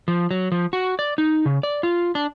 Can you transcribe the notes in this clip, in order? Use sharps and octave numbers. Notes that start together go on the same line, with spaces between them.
F3
F#3
F3
F#4
D5
D#4
C#3
D5
F4
D4